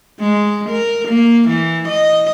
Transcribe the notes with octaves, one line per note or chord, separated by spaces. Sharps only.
G#3
A#4
A#3
E3
D#5